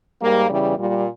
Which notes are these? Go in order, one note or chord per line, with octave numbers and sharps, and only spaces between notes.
G#2 G3 A#3
E2 C#3 E3 G3
A#2 G3